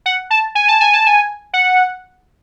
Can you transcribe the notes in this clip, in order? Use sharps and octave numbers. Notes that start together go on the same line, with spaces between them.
F#5
A5
G#5
A5
G#5
A5
G#5
F#5